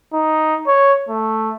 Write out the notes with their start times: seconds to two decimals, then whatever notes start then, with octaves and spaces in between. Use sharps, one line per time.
0.13 D#4
0.67 C#5
1.09 A3